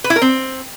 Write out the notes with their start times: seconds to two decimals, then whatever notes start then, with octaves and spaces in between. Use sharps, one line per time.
0.04 B4
0.10 E4
0.16 A#4
0.22 C4